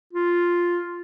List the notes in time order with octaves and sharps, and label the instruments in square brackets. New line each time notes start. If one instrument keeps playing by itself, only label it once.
[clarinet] F4